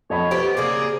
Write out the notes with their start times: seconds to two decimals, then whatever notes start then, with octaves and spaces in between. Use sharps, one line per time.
0.10 F2 C#5 D#5 B5
0.31 B3 G4 C5
0.57 C#3 A#3 C4 G#4 D5